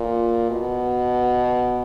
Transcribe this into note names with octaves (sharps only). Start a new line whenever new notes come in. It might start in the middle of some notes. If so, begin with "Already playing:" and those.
Already playing: A#2
B2